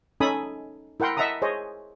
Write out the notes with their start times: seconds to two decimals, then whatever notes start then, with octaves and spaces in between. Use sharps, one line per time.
0.20 C#4 D#4 A4 G#5 B5 D#6
1.00 E4 A#4 F#5 G5 C6
1.17 D#5 E5 F#5 A5 A#5 D#6
1.42 G#4 C5 C#5 D#5